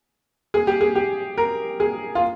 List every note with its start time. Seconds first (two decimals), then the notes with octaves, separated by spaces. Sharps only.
0.54 G#4
0.67 G4
0.81 G#4
0.95 G4
1.38 A#4
1.80 G#4
2.15 F4